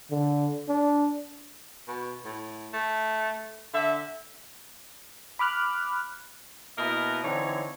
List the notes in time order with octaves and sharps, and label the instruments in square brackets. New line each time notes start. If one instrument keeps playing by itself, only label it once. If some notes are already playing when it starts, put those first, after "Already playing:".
[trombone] D3
D4
[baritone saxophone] B2
A2
A3
[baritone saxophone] D3 [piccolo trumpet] E5
[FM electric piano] B5 D6 F6 F#6
[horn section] B2 A#3 E4 A#4 B4 D#5
D3 E3 C4 D#4 C#5